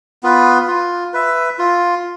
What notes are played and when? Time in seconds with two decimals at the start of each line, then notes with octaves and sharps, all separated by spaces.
0.23 B3 F4 B4
0.68 F4
1.14 B4 E5
1.59 F4